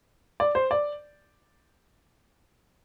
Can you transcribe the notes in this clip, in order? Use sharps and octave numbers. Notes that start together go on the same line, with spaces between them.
D5
C5
D5